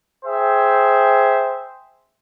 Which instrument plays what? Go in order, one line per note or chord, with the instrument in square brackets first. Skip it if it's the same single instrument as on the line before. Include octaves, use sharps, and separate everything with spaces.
[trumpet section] G#4 C5 E5 G5